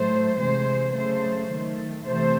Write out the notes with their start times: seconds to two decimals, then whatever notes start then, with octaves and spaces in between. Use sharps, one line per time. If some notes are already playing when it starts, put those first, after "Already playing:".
Already playing: A2 F#3 A3 C5
0.38 C3 E3 G#3 C5
0.94 C#3 F#3 A3 C5
1.51 D#3 A3
2.06 C3 E3 A3 C5